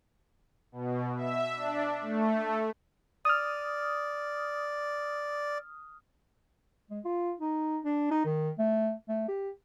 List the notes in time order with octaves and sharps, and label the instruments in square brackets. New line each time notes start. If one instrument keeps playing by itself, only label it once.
[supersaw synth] B2
E5
D4
A3
[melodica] D5 [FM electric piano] D#6 F6
[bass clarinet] G#3
F4
D#4
D4
D#4
D#3
A3
A3
G4